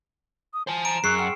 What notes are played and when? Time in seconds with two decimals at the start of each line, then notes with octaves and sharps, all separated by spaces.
0.54 D#6
0.67 C5 G#5 A5
0.85 A#5 D7 E7
1.04 F#2 G#4 C#6 E6 F#6 C7 C#7
1.19 F#5 G5 C6 F6